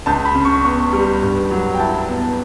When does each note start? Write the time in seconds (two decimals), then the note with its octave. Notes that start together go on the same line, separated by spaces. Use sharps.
0.06 C#2 A5
0.25 B5
0.35 C#3
0.45 C#6
0.64 B3 C#6
0.93 G3
1.22 G2
1.51 F#3
1.74 G5
1.79 E4 A5
2.09 B3